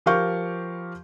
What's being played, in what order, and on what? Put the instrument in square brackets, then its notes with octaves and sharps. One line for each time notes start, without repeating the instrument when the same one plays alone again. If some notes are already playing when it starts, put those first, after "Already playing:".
[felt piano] F3 G4 A#4 F5 C#6 G6